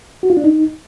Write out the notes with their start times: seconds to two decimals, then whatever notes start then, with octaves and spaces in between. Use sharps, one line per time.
0.23 F#4
0.30 F4
0.37 D4
0.44 D#4